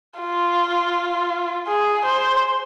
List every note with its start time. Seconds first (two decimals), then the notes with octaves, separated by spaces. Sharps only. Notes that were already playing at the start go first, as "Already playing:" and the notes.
0.20 F4
1.68 G#4
2.05 C5